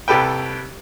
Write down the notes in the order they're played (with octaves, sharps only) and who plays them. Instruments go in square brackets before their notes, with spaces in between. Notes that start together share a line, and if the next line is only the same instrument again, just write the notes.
[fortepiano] C2 G3 G4 A4 B4 G5